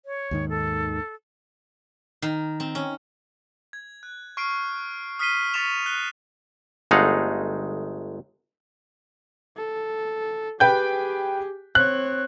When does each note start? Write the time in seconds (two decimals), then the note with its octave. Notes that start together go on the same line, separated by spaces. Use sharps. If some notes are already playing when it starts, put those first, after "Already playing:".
0.06 C#5
0.31 D#2 G#2 D#3
0.49 A4
2.22 D#3
2.60 C4
2.75 C#4
3.73 G#6
4.03 F#6
4.37 C#6 F6 C7 D7
5.19 D#6 F6 B6 C7 D#7 G7
5.54 C#6 A6 B6 C#7 E7 F7
5.86 F#6 F7 G7
6.91 G1 G#3 A3 D#4 F5 F#5
9.57 A4
10.60 G4 G#4 B4 G5 G6
11.75 C4 C#5 F#6